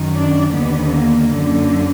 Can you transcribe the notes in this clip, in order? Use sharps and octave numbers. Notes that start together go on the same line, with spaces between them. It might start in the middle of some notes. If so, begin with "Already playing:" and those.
Already playing: F#2 D#3
D4
D#2 D3 B3
A#3
F#2 D3